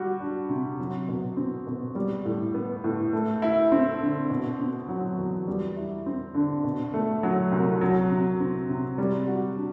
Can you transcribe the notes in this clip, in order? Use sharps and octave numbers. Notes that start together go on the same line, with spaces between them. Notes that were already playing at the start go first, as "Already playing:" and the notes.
Already playing: G3 F#4
D4
C3
F#3
B2
C4
B2
G3
A2
B3
A2
A3
E4
C4
D3
B2
C4
F#3
E2
G3
E4
C4
D3
B2
A3
F#3
C2
F#3
C3
C4
C3
G3
F#4
D4